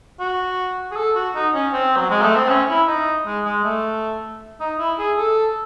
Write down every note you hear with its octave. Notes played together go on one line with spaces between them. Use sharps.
F#4
G#4
A4
F#4
D#4
C#4
C4
F#3
G#3
A3
C4
C#4
E4
D#4
G#3
G#3
A3
D#4
E4
G#4
A4